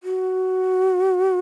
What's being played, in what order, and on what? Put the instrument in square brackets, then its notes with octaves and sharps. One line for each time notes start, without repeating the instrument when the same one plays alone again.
[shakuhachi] F#4